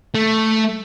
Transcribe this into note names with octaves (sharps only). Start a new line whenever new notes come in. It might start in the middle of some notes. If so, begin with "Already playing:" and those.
A3